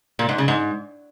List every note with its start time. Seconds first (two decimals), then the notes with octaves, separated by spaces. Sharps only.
0.19 A#2
0.29 G#2
0.38 C#3
0.48 G#2